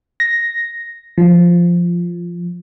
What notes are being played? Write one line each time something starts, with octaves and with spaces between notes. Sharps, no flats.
A#6
F3